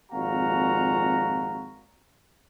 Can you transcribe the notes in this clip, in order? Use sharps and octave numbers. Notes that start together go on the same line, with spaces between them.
G#1 F2 A#2 F#4 F5 A#5